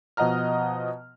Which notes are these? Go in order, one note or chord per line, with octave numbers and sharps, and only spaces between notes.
B2 F3 D#5 F#5 A#5 F6